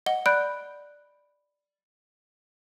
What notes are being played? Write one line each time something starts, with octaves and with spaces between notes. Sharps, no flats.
D#5 F#5 G7
D5 B5 F#6 G6 D7